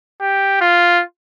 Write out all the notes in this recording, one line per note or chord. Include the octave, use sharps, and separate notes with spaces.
G4
F4